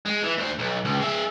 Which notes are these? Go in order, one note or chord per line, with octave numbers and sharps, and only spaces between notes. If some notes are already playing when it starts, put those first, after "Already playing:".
G#3
E3
D2 C5
B1
C#2
G#3 E5